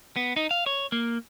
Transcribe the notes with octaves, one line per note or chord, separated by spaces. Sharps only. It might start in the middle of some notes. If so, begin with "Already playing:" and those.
B3
D#4
F5
C#5
A#3